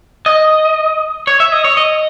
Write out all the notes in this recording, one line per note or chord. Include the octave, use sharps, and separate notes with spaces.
D#5
C#5
E5
D#5
C#5
D#5